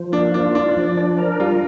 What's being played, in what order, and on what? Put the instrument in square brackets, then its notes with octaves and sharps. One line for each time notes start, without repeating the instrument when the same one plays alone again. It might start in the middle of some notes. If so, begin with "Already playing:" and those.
Already playing: [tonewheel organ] F3
[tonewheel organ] A#3 [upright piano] D4
[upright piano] D4 [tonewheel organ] F4
[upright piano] D4 [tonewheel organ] D5
[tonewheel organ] F3
D4
A#4
[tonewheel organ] G3 [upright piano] F4